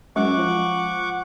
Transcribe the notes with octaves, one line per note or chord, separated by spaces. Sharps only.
F#2 G#3 F#5 C#6 D6
F3